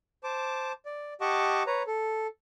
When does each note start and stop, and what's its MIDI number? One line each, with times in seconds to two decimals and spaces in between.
0.24 0.72 72
0.24 0.72 81
0.24 0.72 86
0.86 1.14 74
1.21 1.63 67
1.21 1.63 75
1.21 1.63 78
1.21 1.63 81
1.21 1.63 85
1.21 1.63 86
1.67 1.83 71
1.67 1.83 73
1.67 1.83 82
1.87 2.27 69